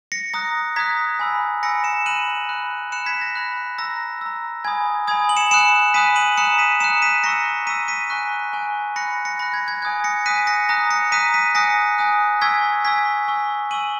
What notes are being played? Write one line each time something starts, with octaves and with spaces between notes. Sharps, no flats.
A#6 C#7
A#5 D#6 F#6 A#6
A#5 D#6 F#6 G#6 B6
G#5 B5 E6
G#5 B5 E6 A#6 C#7
C#7 E7
B5 F#6 D#7 F#7
B5 F#6
B5 F#6 C#7 E7
G#6 B6
A#6
B5 F#6
A#5 E6 A#6
A#5 E6
G#5 B5 D#6 G#6
G#5 B5 D#6 G#6
F#7
C#7 E7
G#5 B5 D#6 F#6 C#7 E7
G#5 B5 D#6 F#6 B6 D#7
D#7 F#7
A#5 D#6 F#6 C#7 E7
B6 D#7
A#5 D#6 F#6 C#7 E7
B6 D#7
A#5 C#6 E6 A#6 C#7
A#5 C#6 E6 B6 D#7
B6 D#7
G#5 C#6 F#6
G#5 C#6 F#6
B5 F#6 A#6 C#7
A#6 C#7
B5 F#6 A#6
G#6
G#6
G#5 D#6 F#6 G#6
A#6 C#7
G#5 D#6 F#6 B6 D#7
A#6 C#7
A#5 D#6 F#6 A#6
A#6 C#7
A#5 D#6 F#6 B6 D#7
B6 D#7
G#5 D#6 F#6 A#6 C#7
G#5 D#6 F#6
G#5 C#6 E6 G#6 B6
G#5 C#6 E6 G#6 B6
G#5 C#6 E6
G#5 C#6 E6 D#7 F#7